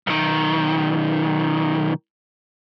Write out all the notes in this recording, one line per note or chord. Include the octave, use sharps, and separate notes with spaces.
B1 D#3